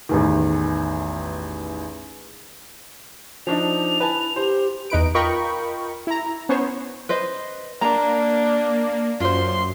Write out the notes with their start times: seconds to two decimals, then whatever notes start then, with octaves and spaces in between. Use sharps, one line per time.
0.09 A1 E2 D#3
3.47 F3 D4 D#4 F7
4.00 E4 B4 G#5 A5
4.36 G4 C5
4.90 E2 D#4 B4 D7
5.15 F4 A#4 D#5 G5 B5 C#6
6.07 E4 A#5
6.49 B3 C#4 C5 C#5
7.09 B4 C5 D#5
7.81 A#3 D4 A#5
9.20 F#2 F4 C5 C6